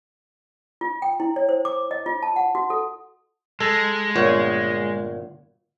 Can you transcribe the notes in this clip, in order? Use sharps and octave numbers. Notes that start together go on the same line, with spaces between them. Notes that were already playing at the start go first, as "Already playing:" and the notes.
F4
G5
E4
C#5
C5
D6
D#5
F4
A5
F#5
F#4
A4
G#3 A4
G1 A#2 C#5